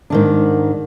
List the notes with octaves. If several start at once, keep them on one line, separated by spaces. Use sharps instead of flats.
G#2 D#3 D4